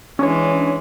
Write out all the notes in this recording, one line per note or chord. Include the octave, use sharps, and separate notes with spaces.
E3 G#3 C#4 D4 C#5